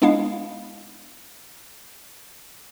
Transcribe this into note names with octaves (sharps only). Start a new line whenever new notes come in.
G#3 B3 D4 E4 F5